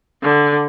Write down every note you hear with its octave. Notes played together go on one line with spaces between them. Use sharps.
D3